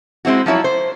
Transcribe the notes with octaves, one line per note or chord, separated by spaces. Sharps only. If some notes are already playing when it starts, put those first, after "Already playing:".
G#3 C4 E4 F#4
F3 F#3 E4 C#5
C5